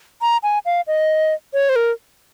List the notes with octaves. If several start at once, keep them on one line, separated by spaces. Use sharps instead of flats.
A#5
G#5
F5
D#5
C#5
C5
A#4